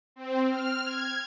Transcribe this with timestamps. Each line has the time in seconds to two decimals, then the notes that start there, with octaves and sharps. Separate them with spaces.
0.16 C4
0.48 F6
0.85 G#6